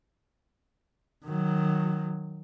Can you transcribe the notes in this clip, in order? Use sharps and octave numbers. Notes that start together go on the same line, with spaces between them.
D#3 F#3